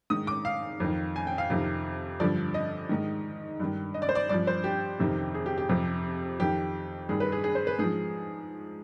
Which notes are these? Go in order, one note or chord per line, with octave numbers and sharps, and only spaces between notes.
G#2 D#3 D#6
D6
F5
F2 D#3
G#5
G5
F5
F2 C3 D#3
G2 D3 F3 D5
D#5
G#2 D#3
G2 D#3
D#5
D5
C5
D5
G2 F3 D5
C5
G4
F2 C3 D#3
G#4
G4
G4
F2 C3 F3
F2 D#3 G4
G2 D#3 G#4
B4
G#4
G#4
C5
B4
G#2 F3 G#4